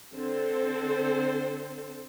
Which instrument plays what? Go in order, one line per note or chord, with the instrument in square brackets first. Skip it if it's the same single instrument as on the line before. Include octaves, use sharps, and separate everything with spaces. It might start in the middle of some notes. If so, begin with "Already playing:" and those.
[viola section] D3 C4 A4 C5